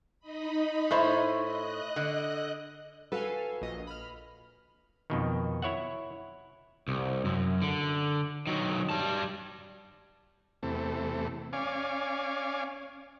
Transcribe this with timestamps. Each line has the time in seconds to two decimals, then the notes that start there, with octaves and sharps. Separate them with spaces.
0.19 D#4 D#5 B5
0.91 A2 E4 C5
1.39 D#5 F#6
1.96 D3
3.12 F#4 A4 B4 F5 G#5
3.62 A#1 D#5
3.87 B5 F6
5.10 F2 B2 D#3
5.62 E4 C#5 E5 F#5
6.88 C2
7.25 F#2
7.62 D3
8.47 D#3 F#3
8.90 G3 A5
10.63 E2 C3 A3
11.53 C#4 D5 F5 G#5